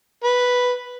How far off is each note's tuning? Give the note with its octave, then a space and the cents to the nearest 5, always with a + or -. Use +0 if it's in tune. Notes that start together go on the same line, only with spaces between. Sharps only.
B4 +0